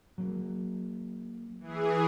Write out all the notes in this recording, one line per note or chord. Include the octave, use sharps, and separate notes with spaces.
F#3 A#3
E3 G#4